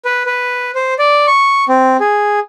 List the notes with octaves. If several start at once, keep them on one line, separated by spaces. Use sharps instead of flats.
B4
B4
C5
D5
C#6
C4
G#4